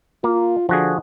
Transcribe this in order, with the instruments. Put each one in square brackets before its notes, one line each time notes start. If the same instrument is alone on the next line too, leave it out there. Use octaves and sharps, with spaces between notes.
[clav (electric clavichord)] A#3 [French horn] F4
[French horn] D3 [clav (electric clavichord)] F3 F#4 G#4